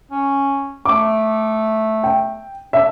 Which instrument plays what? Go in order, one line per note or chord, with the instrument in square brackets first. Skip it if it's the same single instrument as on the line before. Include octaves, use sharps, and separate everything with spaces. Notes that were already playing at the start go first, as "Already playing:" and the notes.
[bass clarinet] C#4
[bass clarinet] A3 [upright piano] D6
[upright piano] G5
[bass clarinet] D4 [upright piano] E5